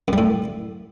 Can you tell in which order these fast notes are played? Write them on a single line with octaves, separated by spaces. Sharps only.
F#2 G3 A2